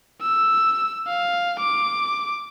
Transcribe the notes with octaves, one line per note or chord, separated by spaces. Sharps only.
E6
F5
D6